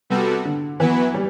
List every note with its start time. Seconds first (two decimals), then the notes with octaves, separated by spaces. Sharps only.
0.10 C3 G3 B3 F#4 A4
0.45 D3
0.79 E3 F#3 B3 E4 B4
1.14 G3